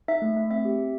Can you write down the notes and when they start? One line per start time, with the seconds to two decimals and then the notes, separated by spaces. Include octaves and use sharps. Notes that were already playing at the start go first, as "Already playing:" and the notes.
0.08 D#4 E5
0.22 A3
0.37 A3
0.51 C4 E5
0.65 G4
0.79 G4